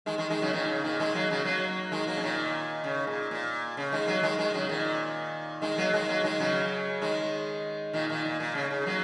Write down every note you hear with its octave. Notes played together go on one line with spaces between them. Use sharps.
D#3 G#3
D#3 G#3
D#3 G#3
C#3 F#3
A#2 D#3
C#3
A#2 D#3
D#3 G#3
F#3 A#3
C#3 F#3
F#3 A#3
D#3 G#3
F#3 A#3
C#3
A#2 D#3
C#3
A#2
A#2
C#3
D#3 G#3
F#3 A#3
D#3 G#3
D#3 G#3
C#3 F#3
A#2 D#3
D#3 G#3
F#3 A#3
D#3 G#3
F#3 A#3
D#3 G#3
C#3 F#3
D#3 G#3
A#2 D#3
A#2 D#3
A#2
A#2
C#3
C#3
F#3 A#3